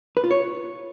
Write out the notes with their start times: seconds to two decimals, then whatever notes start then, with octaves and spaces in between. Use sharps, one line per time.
0.17 B4
0.24 F4
0.31 C#5